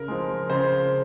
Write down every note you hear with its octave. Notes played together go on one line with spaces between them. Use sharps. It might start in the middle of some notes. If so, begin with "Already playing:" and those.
Already playing: C#3 A#4
F3 G#3
C#3 C5